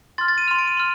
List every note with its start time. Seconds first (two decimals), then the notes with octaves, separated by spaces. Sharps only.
0.18 C6 F6 A6
0.28 A6
0.38 D#7
0.47 C6 F6 F7
0.58 D7
0.68 D#7
0.77 C6 F6